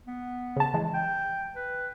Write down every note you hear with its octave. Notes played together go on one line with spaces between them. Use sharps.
B3
C#3 A5
E3 G#3
G5
B4